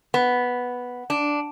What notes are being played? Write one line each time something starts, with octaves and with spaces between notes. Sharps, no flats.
B3
D4